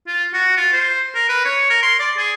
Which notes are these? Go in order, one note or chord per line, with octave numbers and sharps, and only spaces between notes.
F4
F#4
F4
C5
A#4
B4
C#5
A#4
C6
D5
G#4